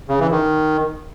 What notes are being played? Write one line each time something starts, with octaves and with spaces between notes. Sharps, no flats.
C#3
E3
D#3